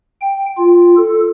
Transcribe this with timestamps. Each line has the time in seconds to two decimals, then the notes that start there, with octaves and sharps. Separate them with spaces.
0.21 G5
0.57 F4
0.97 A4